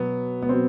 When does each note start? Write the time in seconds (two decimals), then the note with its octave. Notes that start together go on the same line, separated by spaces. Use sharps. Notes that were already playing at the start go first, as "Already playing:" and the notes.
Already playing: B2 F#3 B3
0.42 B3
0.49 B2 F#3 C4